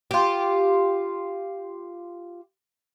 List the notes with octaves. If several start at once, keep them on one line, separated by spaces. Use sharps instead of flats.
F4 G4